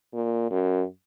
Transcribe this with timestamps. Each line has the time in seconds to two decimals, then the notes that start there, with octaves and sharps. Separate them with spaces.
0.13 A#2
0.51 F#2